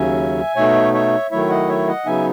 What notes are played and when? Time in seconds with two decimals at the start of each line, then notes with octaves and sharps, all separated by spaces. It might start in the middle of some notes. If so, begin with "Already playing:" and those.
Already playing: D#2 C#3 F#3 C#4 E5 G#5
0.56 B2 A3 D#4 C#5 E5
0.94 C#5 E5
1.31 D#3 F#3 A3 E4 C#5 E5
1.50 D#5 F#5
1.68 C#5 E5
1.88 D#5 F#5
2.06 C#3 F#3 B3 D#4 E5 G#5